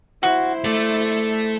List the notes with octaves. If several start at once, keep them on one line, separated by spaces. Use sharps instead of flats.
E4 F#4 C5
A3 D5